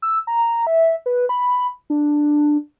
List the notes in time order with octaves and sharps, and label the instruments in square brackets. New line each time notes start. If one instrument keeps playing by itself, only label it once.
[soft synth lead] E6
A#5
E5
B4
B5
D4